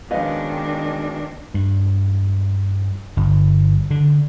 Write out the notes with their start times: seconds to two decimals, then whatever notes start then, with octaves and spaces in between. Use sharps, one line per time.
0.11 B2 D#3 G#3 C#4 D4 B4 D#5 F5
1.54 G2
3.17 G1
3.91 D3